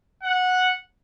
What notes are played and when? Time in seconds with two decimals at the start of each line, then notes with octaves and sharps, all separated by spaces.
0.23 F#5